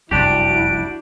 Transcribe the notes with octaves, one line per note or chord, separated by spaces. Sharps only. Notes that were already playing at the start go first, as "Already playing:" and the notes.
F1 C2 F#2 D4 E4 F#4 G4 D7